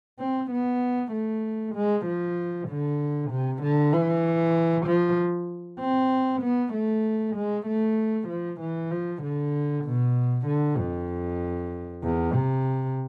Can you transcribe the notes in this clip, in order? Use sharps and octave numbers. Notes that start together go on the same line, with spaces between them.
C4
B3
A3
G#3
F3
D3
C3
D3
E3
F3
C4
B3
A3
G#3
A3
F3
E3
F3
D3
B2
D3
F2
E2
C3